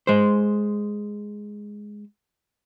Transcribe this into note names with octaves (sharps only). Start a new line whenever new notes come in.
G#3 C5